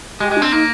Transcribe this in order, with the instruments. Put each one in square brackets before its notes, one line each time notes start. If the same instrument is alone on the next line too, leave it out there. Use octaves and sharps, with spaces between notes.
[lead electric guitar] G#3 [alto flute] G4
[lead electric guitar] G#3
[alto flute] D4
[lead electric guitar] C4
[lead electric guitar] A#3 [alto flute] D#4